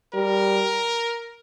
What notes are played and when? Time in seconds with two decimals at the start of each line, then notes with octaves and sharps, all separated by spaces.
0.13 G3 A#4